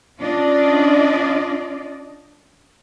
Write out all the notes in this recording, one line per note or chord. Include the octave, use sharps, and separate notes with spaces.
C#4 D4 F4 D5 D#5